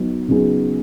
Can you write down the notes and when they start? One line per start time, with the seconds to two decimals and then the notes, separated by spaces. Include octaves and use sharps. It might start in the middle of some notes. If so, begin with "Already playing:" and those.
Already playing: F#3 B3 D#4
0.28 C#3 F#3 B3 D#4 G#4